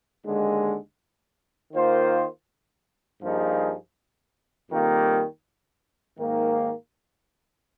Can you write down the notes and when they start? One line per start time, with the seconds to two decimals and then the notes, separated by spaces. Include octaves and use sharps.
0.24 D#2 D3 G#3
1.73 D#3 A#3 F4 C5
3.22 G2 F3 A#3 D#4 G#4
4.70 F2 D#3 G3 A#3
6.19 G#2 D#3 A#3